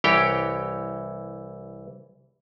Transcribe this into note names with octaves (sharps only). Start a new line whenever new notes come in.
C2 E3 G4 C#5 G5